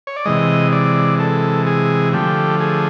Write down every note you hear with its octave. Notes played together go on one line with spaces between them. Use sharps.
C#5
D5
C3 E3 G#3 D#5
D5
A4
G#4
D3 F3 A3 G4
G#4